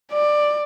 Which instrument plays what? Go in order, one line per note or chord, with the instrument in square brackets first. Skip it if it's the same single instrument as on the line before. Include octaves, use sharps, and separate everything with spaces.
[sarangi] D5